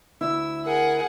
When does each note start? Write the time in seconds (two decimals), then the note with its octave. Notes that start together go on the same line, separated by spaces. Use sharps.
0.21 D2 E4 E6
0.66 G#4 A#4 F#5